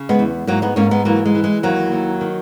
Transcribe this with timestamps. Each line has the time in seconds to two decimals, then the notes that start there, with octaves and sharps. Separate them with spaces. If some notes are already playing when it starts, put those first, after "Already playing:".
Already playing: C#3
0.09 G#3 B3
0.19 E2
0.47 G#2 F#3 A#3
0.62 G#3 B3
0.76 G#2 A#3 C#4
0.91 G#3 B3
1.05 E3 F#3 A#3
1.26 G#3
1.35 E3
1.44 G#3
1.63 D#2 F#3 A#3
1.92 D#2
2.21 D#3